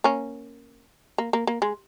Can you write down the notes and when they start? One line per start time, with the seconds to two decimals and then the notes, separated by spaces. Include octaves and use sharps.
0.04 A#3 C#4
1.18 A#3
1.33 A#3
1.47 A#3
1.62 G#3